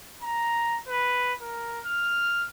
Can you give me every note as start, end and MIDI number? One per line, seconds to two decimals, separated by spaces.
0.23 0.79 82
0.89 1.33 71
1.42 1.79 70
1.85 2.46 89